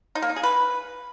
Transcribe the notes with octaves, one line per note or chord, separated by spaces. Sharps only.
D#4
A#3
D#4
G#4
B4